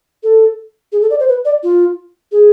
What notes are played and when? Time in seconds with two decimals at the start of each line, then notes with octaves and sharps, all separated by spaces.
0.23 A4
0.92 G#4
1.01 A4
1.10 D5
1.19 C5
1.28 B4
1.45 D5
1.63 F4
2.32 G#4